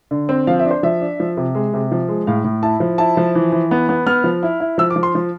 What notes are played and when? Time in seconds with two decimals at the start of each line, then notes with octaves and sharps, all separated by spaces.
0.11 D3
0.29 C4
0.47 F3 F5
0.59 E5
0.65 D4
0.71 C5
0.83 F3 E5
1.01 D4
1.20 F3
1.37 C3
1.55 G#3
1.74 C3
1.92 F3
2.08 G#3
2.27 A2 F5
2.44 A2
2.63 E4 A5
2.80 F3
2.98 E4 A5
3.17 F3
3.35 E3
3.52 E3
3.71 B3
3.89 B3
4.06 B3 F6
4.24 F3
4.43 E4
4.60 E4
4.78 F3 E6
4.90 D6
4.96 F3
5.03 C6
5.15 F3